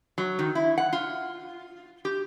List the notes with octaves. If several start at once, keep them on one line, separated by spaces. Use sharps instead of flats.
F#3
D#3
E4
F#5
F4
G4